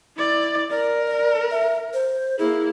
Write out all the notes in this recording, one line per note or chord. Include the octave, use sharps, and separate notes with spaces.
E4 D5
A#4 D5
D5
E5
C5
A#3 E4 G#4